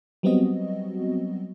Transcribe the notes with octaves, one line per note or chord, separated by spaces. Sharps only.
F#3 G3 B3 C4 F#4 D#5